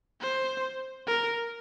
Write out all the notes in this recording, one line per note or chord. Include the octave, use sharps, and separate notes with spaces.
C5
A#4